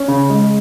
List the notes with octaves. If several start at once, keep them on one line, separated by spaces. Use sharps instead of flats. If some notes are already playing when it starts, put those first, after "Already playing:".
Already playing: C#4
C#3
G#3